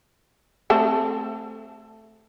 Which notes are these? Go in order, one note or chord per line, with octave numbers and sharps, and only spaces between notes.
A3 C4 A4